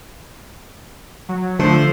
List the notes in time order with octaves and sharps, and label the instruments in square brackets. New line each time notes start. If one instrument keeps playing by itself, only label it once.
[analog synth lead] F#3
[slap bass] D3 [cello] F3 C5 [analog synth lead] A3